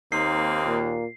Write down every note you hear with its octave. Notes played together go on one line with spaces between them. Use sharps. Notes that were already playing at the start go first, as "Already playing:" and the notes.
D#2 A#3 C4 D#4 C7
A#2